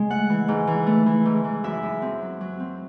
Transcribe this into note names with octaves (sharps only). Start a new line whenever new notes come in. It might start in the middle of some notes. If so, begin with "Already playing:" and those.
Already playing: C#3 G#3
A3 F#5
E3
G#2
E3
A3
E3
G#2
E3
F#2 E5
F#2
C4
F#3
F#3
C4